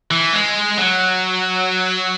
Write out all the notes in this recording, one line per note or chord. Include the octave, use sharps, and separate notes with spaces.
E3
G#3
F#3